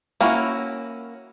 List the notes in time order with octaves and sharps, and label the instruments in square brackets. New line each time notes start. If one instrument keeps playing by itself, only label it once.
[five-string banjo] A#3 C#4 E4 F#4